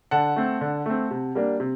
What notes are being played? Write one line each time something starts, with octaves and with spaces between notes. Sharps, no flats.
D3 F#5 A5
A3 C4
D3
A3 C4
C3
G3 A#3 D4
C3